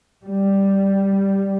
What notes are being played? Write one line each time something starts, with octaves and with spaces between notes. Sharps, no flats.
G3